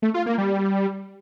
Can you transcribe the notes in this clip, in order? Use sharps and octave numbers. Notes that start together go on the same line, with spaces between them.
A3
F4
A#3
G3